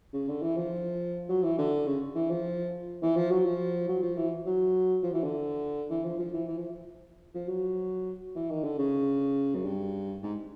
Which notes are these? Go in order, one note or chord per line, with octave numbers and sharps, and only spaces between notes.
C#3
D3
E3
F3
F#3
E3
D3
C#3
E3
F3
E3
F3
F#3
F3
F#3
F3
E3
F#3
F3
E3
D3
E3
F3
F3
E3
E3
F3
F3
F#3
E3
D#3
D3
C#3
F#2
G2
G#2